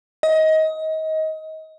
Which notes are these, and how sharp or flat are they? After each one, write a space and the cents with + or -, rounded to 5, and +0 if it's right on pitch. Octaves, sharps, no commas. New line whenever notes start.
D#5 +25